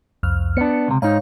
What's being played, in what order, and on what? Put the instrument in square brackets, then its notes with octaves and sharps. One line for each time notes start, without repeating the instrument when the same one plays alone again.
[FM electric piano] C2 F2 F6
[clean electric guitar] B3 D4 [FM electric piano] C#7
[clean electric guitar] C#2 C3
[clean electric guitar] G#2 D#4 [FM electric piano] C#5 F5